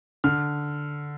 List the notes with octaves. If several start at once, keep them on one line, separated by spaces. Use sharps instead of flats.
D3 F6